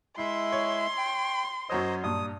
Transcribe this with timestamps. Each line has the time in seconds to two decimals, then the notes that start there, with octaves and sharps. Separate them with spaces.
0.18 G#3 E4 E5 C6 C7
0.52 C#5
0.98 G5
1.70 F#2 F#3 C5 C#5 D#5 D#6
2.04 G2 A#2 D#6